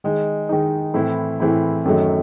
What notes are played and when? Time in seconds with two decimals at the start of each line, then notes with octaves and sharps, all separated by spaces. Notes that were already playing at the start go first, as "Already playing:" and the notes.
0.04 D#3 G#3 D#4
0.49 D#3 G#3 D#4
0.94 A2 E3 C4 E4
1.40 A2 E3 C4 E4
1.85 F#2 D#3 F#3 A3